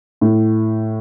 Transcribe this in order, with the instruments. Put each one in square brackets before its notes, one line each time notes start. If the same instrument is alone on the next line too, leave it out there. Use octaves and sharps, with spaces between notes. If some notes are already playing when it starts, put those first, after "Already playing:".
[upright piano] A2